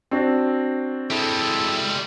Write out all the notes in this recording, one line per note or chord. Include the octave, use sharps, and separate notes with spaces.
C4 D4 F#4
G3 G#3 E4 A4